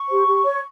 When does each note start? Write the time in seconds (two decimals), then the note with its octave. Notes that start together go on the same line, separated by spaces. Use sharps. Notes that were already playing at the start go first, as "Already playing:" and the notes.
Already playing: C#6
0.09 G4 C5
0.27 G4
0.44 C#5